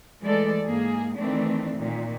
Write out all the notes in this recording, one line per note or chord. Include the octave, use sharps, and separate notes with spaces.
E3 G#3 A3 A4 D5
G#2 A#3 G#4
D#3 E3 A3 C4 D4
A#2 D#3